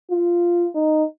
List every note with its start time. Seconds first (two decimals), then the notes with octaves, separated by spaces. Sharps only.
0.11 F4
0.75 D#4